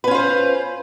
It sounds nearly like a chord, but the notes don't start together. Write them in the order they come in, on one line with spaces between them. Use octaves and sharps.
B4 C#4 F4 C5